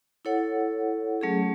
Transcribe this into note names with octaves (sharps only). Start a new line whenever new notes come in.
E4 A4 C#5 F#5
F#3 A3 C#4 G#4